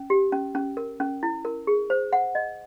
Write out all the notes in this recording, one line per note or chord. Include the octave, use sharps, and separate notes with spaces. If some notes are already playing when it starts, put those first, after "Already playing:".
Already playing: C#4
G4
C#4
C#4
A#4
C#4
E4
A#4
G#4
C5
F#5
D#5